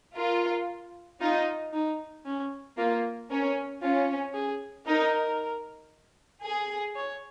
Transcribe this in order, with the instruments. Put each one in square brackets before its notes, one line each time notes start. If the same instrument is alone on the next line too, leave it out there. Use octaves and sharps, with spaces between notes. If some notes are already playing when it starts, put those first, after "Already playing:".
[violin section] F4 [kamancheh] A#4
[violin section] D#4 [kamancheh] F4
[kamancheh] D#4
C#4
[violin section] A#3 [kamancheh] F4
[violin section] C#4 [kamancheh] A#4
[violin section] C#4 [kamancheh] F4
[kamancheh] G#4
[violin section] D#4 [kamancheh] A#4
[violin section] G#4
[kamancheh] C#5